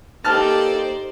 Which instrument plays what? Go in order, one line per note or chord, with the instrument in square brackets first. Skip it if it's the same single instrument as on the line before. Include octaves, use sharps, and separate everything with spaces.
[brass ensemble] A#3 A4 [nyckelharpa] D#4 G4 [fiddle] C5 D5 [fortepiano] A5 F6